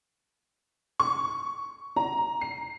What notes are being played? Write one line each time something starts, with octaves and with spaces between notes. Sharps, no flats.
C#6
A#5
C7